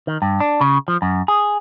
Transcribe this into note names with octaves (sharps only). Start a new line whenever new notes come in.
D#3
G2
D4
C#3
F3
F#2
G#4